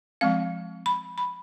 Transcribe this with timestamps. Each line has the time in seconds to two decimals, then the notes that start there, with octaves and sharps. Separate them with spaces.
0.21 F3 G#3 C4 F5
0.86 B5
1.18 B5